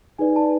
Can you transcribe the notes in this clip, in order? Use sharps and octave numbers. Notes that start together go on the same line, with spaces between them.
D#4 G#4 B4 D5 G#5
A5